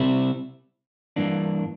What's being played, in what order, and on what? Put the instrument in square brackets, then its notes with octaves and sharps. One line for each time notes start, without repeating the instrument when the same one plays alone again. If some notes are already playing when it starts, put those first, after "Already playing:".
Already playing: [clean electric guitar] C3 G3 C4 E4
G2 E3 A#3 D4